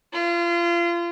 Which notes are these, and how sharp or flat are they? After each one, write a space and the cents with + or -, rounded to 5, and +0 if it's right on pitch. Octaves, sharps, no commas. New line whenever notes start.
F4 -30